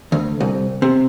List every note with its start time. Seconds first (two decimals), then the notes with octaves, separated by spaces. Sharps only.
0.12 D2
0.40 C2
0.82 C3